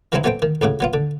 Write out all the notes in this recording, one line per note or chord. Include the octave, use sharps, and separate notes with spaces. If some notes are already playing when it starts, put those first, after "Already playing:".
E3 F#3 G#3 C4 D#4 E4
F#3 A3 B3 C4 G5
D#3
C#2 A2 C#3 F#4
F#3 B3 F4
D3